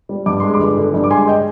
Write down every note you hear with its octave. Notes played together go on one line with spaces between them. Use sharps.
G3
G2 D6
G#3 C6
B5 D6
G1
D3
G2
D6
G#3 G#5 C6
D#5 G5